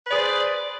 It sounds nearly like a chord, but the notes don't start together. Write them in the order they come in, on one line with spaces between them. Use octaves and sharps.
B4 D5 G#4 C5